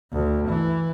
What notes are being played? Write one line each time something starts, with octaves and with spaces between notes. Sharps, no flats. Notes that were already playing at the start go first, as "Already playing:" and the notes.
D2
E3